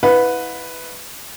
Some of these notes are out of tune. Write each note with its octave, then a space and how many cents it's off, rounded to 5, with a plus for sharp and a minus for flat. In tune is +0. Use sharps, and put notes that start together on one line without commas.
E4 -30 B4 +5 F#5 -40